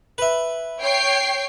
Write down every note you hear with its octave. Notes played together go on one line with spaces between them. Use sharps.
B4 E5
C#5 G5 C7